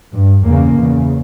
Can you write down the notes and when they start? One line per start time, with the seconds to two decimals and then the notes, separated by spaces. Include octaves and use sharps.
0.14 G2
0.45 E2 C#3 A#3
0.77 E2 C#3